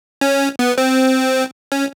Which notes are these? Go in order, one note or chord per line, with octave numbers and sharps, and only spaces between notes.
C#4
B3
C4
C#4